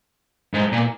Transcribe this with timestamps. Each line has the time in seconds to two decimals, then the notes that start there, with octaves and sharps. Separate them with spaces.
0.54 G#2
0.72 A#2